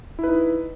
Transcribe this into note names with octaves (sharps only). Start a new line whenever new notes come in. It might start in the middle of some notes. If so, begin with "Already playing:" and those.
D#4 E4 B4